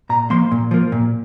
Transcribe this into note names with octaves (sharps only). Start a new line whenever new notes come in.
A#2 A#5
F3 A#3 C6
A#2
F3 A#3
A#2